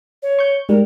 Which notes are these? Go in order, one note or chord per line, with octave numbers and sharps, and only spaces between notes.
C#5
C#6 G6
G#2 G3 A#4